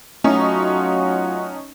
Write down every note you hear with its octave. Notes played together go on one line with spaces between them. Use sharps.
F#3 A3 C#4 D#4 F4 F#4